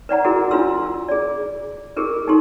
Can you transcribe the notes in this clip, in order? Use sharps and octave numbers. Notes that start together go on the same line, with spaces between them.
B4 D5 F#5 A#5
E4 F#4 G#4 A#4 F#5
D4 F4 B4 C6 E6
G#4 D5
G4 G#4 A#4 B4
D#4 G4 A4 C6